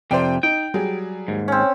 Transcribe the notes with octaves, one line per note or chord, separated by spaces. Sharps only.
F2 C3 C5 D5 G5
D#4 G5
F#3 G3 G#4
D#2 G#2
C4 C#4